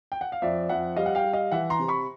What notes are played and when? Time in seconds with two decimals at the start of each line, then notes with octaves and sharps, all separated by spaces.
0.12 G5
0.21 F#5
0.32 F5
0.42 F2 D5 E5
0.69 F2 E5 F#5
0.96 G3 D#5 F5
1.06 F#5
1.15 F5 G5
1.24 G3
1.33 D#5 F5
1.51 E3 E5 F#5
1.70 A#5 C6
1.79 C3
1.88 B5 C#6